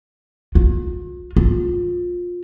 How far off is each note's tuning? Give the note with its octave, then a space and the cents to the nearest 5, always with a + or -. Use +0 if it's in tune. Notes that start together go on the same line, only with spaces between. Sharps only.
F4 +45
F4 +20